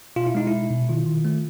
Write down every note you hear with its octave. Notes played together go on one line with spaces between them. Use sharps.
B2 F4
E4
G#3 D#4
E4
B2
B2
D#3 F4
D#3
A3